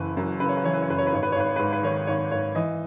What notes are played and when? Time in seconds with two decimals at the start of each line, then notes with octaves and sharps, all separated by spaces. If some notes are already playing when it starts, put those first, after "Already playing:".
Already playing: F#1 E3 B4
0.17 F#2
0.40 C#3 B4
0.49 C#5
0.57 B4
0.64 E3 C#5
0.74 B4
0.82 C#5
0.88 F#1 B4
0.98 C#5
1.07 B4
1.12 G#1 C#5
1.23 B4
1.32 C#5
1.36 G#1 B4
1.48 C#5
1.56 G#2 B4
1.73 B4
1.83 D#3 C#5
2.07 G#1 C#5
2.31 G#1 C#5
2.55 E3 D#5